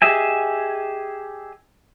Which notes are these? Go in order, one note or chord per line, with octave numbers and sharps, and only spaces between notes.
G4 G#4 D#5 E5 G#5